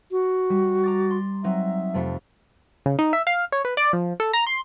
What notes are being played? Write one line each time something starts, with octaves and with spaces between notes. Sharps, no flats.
F#4
G3
A#5 D6 A6
C6
F#3 C4 D#4 E5
F2 C3 A3
C#3
D#4
E5
F5
C#5
B4
D5
F3
A4
A#5
C6